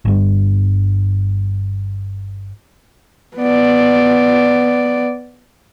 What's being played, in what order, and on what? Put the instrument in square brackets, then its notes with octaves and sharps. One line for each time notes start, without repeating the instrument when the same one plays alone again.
[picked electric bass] G1 G2
[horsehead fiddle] B3 D5